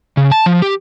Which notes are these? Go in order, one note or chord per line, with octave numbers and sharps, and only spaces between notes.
C#3
A5
F3
G4